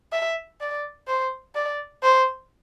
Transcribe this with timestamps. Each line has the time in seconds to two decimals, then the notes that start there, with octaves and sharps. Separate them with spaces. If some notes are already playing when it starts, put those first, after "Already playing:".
0.12 E5
0.60 D5
1.07 C5
1.55 D5
2.03 C5